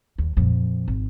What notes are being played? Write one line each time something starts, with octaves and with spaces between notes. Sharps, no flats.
D#2
F2 A#2
G#1